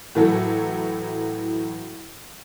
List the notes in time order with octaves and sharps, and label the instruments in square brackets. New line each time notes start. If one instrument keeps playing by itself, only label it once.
[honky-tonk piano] A2 E3 F#3 A4